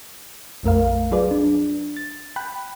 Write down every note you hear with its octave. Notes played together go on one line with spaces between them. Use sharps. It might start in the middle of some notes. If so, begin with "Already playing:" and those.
A#1 F2 A3 A#4 F5
F#3 F4 G#4 B4 D5
D4
A6
G5 B5 F#6